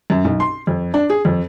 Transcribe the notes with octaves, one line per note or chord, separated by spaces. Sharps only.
F#2
B1
C6
F2
D4
G#4
F2